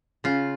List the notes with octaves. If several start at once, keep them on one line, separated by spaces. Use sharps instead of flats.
C#3 F4